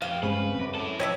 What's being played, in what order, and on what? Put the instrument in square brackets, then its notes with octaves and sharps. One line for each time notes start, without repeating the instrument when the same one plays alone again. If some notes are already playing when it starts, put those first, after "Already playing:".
[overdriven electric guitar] F2 G4 [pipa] F5
[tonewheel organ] G2 G#3 C4 [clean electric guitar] C#3 [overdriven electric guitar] B4
[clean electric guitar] F#2 [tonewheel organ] D6
[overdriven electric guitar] E4 A4
[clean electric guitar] F2 C3 [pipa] C#5 D#5 E5